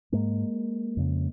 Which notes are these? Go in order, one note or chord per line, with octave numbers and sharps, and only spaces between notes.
G#2 G#3 A#3
F2 C#3